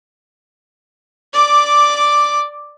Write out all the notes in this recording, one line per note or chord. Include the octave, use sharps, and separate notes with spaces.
D5 D6